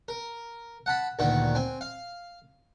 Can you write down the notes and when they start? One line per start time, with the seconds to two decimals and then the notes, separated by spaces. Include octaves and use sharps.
0.08 A#4
0.86 F#5 A5 B5
1.19 D2 A#2 D#3 F#4 B4
1.55 C4 G#5
1.81 F5